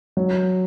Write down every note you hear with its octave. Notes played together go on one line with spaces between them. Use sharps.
F#3